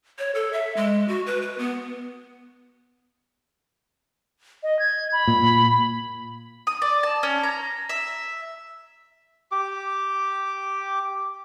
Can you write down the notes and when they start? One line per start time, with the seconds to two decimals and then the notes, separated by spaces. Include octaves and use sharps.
0.19 C#5
0.35 A4
0.53 E5
0.76 G#3
1.08 F#4
1.26 B4
1.42 B4
1.58 B3
4.63 D#5
4.79 G#6
5.12 B5
5.27 A#2
6.67 D#6
6.82 D5
7.03 A5
7.23 C#4
7.43 A#5
7.89 E5
9.52 G4 D6